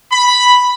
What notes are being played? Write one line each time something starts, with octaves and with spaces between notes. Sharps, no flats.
B5